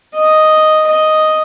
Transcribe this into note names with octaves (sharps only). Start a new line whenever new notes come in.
D#5
D#5